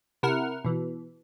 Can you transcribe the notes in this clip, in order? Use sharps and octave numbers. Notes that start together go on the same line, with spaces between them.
C3 E4 A#4 F#5 F6
B2 E3